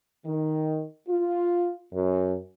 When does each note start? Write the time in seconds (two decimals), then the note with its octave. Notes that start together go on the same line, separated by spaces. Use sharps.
0.24 D#3
1.08 F4
1.92 F#2